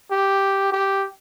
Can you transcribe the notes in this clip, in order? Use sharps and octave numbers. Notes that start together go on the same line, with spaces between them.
G4
G4